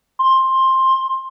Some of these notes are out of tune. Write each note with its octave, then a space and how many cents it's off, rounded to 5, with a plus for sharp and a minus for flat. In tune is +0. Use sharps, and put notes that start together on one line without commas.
C6 +15